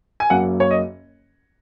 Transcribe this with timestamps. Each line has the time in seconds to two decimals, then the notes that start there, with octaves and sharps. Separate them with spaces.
0.20 G#5
0.30 F#1 F#2 F#3 A#3 F#5
0.60 C#5
0.71 D#5